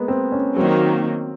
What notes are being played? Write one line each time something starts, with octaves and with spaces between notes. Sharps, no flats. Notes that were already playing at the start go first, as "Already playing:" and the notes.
Already playing: G#3 A#3 B3
C4
C#4
D#3 F#3 A#3 C4